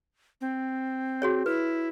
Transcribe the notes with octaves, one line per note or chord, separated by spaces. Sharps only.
C4
F#4 G#4 C#5
E4 B4